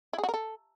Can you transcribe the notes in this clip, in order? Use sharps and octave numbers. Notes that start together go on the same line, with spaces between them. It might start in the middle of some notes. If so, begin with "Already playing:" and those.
E4
G#4
F#4
A#4
A4